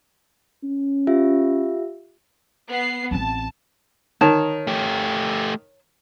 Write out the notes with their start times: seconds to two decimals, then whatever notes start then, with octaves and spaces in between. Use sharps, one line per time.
0.64 C#4
1.07 F4 G4 E5
2.69 B3 C7
3.11 A1 C4 A5
4.21 D#3 C#5 A5
4.67 A3 G4